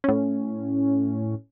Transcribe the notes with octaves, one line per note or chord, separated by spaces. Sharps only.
A2 C#4